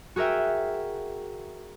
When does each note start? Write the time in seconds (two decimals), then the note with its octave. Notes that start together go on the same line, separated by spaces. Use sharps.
0.16 F#4 G#4 A#4 E5 G5